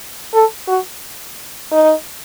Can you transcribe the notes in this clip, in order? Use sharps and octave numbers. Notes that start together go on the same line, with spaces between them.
A4
F#4
D#4